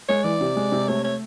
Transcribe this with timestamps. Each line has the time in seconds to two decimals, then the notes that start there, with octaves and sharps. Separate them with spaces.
0.09 G#3 C#5
0.24 E3 D5
0.41 C3
0.56 G#3
0.72 C3
0.88 A3 C#5
1.04 C#5